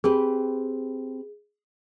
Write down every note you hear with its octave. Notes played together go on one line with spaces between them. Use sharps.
C4 G4 G#4 B4